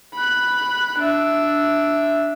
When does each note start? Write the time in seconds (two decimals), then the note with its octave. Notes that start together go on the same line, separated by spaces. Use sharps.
0.15 B5 F#6
0.98 D4 E5